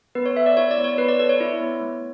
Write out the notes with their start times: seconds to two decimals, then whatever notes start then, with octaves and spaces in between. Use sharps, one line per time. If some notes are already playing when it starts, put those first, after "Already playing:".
0.15 B3 B4
0.26 C#5
0.36 A4 E5
0.46 D5
0.57 E4 C#5
0.71 D5
0.78 B3
0.84 C#5
0.98 B3 B4
1.09 D5
1.19 A4 D5
1.29 C#5
1.40 E4
1.61 B3
1.81 A3